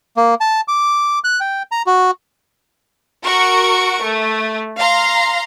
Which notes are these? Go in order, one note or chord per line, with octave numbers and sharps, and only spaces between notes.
A#3
A5
D6
F#6
G5
A#5
F#4
F#4 A#4 C#6 D7
A3
F5 A#5 C6